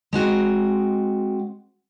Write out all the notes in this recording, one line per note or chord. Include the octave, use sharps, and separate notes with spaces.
G#3 C4 F#4 D#5